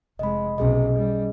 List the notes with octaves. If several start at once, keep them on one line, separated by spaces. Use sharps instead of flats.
F1 G#3 D#5 B5
B1 C3 C#4 G#4 D#5
G3